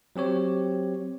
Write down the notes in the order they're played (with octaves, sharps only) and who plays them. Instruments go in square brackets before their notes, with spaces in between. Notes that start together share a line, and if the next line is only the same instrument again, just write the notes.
[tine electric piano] F#3 C4 G4 C#5